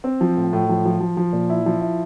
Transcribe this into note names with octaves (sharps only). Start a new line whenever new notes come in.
C4
F3
A2
A2
F3
F3
F3
F3
A#2
E4
F3
E4